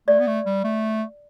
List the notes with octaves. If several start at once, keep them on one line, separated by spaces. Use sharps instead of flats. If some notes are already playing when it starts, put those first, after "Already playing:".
A3 D5
B3
A3
G3
A3